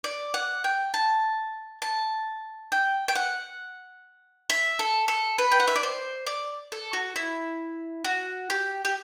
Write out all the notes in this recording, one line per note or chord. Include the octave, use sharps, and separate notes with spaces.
D5
F#5
G5
A5
A5
G5
G5
F#5
E5
A4
A4
B4
G5
F#5
E5
D5
C5
D5
A4
F#4
E4
F#4
G4
G4